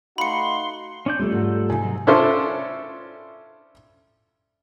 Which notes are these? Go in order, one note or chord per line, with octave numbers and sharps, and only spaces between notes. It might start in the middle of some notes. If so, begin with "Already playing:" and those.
A3 D#4 F#4 F5 B5 C6 C#7
C#4 D4 G6
G3 A3 F4 A4
G#2 F#3 F#4
C3 C4 D#4 G#5
F#3 C4
C#4 D4 E4 F4 A4 C5